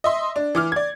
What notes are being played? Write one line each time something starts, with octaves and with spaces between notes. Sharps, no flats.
D#5 E5 C6
D4
E3 D6 F6
D5 G#6